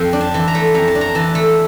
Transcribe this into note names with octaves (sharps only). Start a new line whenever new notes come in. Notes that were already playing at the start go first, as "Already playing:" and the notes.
Already playing: F2 F5 G5
D4
A5
E3
A#5
A3
F2 A#5
A5
D4
A#5
E3 A5
A3